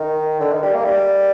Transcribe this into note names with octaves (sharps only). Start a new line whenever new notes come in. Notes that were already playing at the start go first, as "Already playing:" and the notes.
Already playing: D#3
D3
D#3
G3
A#3
G3